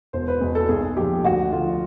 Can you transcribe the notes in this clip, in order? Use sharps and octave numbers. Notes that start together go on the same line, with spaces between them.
E1 C5
B4
E2 B2
A4
B1 G#4
A#2 F3 G4
D2 F#4
D3 F3 F4